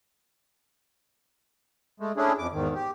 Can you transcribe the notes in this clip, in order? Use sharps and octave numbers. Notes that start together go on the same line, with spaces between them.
G#3 A3
A3 C#4 D4 E4 G#4
F2 D6
E2 G#2 D#3
G4